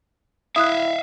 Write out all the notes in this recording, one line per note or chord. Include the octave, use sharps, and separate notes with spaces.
E4 E5 F5 D#6 F#6